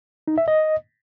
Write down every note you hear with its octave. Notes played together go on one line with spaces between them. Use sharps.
D#4
E5
D#5